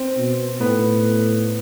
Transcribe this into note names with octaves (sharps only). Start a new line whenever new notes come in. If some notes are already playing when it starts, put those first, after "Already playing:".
Already playing: C4
B2
A2 B3